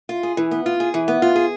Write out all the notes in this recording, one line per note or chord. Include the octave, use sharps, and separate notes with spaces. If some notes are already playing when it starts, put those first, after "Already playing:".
F4
G#4
E3
B3
F4
G#4
E3
B3
F4
G#4